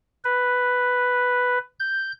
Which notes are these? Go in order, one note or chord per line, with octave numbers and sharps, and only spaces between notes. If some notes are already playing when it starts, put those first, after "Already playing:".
B4
G6